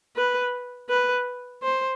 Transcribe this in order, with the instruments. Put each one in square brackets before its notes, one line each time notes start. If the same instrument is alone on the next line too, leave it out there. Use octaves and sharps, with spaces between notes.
[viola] B4
B4
C5